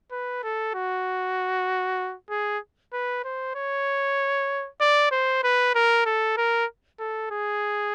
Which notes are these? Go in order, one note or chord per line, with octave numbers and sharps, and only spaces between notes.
B4
A4
F#4
G#4
B4
C5
C#5
D5
C5
B4
A#4
A4
A#4
A4
G#4